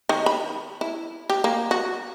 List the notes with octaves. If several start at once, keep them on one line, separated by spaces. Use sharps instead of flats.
D#3
B5
E4
G4
A#3
F#4